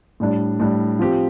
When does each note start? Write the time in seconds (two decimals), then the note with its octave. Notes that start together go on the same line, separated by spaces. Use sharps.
0.20 A2 G3 D4
0.60 A2 G3 D4
0.99 F3 C4 G4